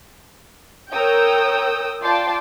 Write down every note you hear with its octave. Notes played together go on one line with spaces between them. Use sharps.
A#4 C#5 G5 D#6 E6 G6
F4 D5 G5 A5 C6 D6